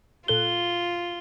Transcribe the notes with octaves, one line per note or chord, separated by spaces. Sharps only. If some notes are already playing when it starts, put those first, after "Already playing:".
A#2 F4 A4 F#6 G7